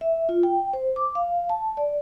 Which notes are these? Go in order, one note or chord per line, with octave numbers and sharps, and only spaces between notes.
E5
F4
G5
C5
D6
F5
A5
D5